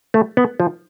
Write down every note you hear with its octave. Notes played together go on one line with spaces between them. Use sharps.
A3
B3
F3